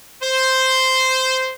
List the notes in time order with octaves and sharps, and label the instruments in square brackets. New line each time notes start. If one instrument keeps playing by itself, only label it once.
[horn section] C5